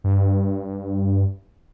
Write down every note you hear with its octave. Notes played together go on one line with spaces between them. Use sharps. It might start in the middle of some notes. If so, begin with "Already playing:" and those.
G2